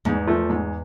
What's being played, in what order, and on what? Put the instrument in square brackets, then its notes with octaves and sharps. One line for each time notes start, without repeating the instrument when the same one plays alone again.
[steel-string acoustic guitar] E2 [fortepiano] G#2
[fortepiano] F3 A3
G#2